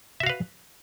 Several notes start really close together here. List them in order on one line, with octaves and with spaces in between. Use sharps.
E5 F#4 F5 B4